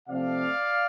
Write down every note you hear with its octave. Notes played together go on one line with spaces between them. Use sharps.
C3 F3 A3 C4 D5 F5